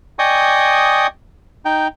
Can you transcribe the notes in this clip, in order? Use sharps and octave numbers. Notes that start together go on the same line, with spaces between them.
D5 D#5 G5 G#5 C#6 D#6
D#4 G5